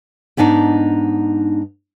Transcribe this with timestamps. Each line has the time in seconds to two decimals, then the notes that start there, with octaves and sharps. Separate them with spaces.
0.37 G#2 B3 D4 D#4 F#5